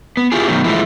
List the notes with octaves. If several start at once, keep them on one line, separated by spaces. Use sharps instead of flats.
B3
E4 F4 G4 G#4
B2 D#3 F#3
E3 F3 G#3 A3 E4